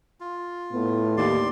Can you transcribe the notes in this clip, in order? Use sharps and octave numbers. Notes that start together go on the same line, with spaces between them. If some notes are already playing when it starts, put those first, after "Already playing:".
F4
A2 B3
D#2 D5 C6